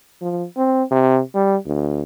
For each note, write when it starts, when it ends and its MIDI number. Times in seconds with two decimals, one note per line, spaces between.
0.22 0.45 53
0.57 0.83 60
0.91 1.20 48
1.35 1.56 55
1.66 2.03 38